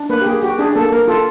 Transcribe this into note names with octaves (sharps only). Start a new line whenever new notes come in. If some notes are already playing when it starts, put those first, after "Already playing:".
Already playing: D4
A#3 B4
G4
A#3 G#4
F#4 G4
D4 G#4
A#3 A4
A#3 A#4
F4 A4